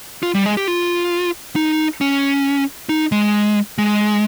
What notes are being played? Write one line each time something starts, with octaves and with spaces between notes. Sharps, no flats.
F4
G3
G#3
G4
F4
D#4
C#4
D#4
G#3
G#3